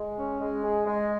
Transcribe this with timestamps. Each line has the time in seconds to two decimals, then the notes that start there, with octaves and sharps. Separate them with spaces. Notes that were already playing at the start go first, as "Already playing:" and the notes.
Already playing: G#3
0.17 C#4
0.40 G#3
0.63 G#4
0.85 G#3